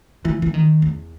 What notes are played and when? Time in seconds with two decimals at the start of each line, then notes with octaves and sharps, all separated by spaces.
0.25 E3
0.42 E3
0.54 D#3
0.82 E2